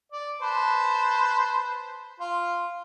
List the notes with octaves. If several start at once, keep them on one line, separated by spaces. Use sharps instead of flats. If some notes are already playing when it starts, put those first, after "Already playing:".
D5
B4 C5 A5
F4